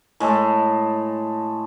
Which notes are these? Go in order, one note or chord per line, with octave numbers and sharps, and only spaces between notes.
A2 G#3 A4